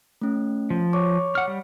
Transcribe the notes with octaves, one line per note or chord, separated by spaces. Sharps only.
A3 C#4
F3
C#5 C#6 D6
F#5 F6
G3